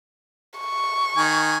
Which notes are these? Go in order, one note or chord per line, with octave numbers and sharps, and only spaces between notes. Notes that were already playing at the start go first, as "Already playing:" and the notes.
C#6
D#3 G#5